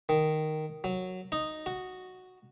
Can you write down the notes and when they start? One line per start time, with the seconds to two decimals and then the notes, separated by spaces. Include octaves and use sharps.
0.09 D#3
0.84 F#3
1.32 D#4
1.66 F#4